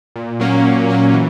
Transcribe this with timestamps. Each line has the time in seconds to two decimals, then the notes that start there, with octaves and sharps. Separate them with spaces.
0.16 A#2
0.40 F#3 A#3 C#4
0.64 A#2
0.89 F#3 A#3 C#4
1.14 E3